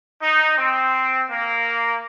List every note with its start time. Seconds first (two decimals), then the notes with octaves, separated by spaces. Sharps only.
0.22 D#4
0.58 C4
1.30 A#3